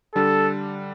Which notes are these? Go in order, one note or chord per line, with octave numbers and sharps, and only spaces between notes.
D3 G3 D4 A4